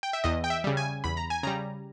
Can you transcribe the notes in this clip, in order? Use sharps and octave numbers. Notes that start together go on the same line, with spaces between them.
G5
E5
E2 D#5
G5
E5
C#3 G3
G#5
E2 B5
A#5
G#5
C#3 G3 A#5